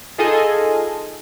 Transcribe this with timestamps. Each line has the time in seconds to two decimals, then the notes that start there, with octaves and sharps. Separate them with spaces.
0.18 D#4 F4 G#4 A4 D#5 G#5